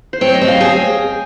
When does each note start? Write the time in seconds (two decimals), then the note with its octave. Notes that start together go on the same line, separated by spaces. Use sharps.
0.13 C5
0.21 C4 C#5
0.34 D#5
0.41 C4
0.48 F5
0.61 G#4 G5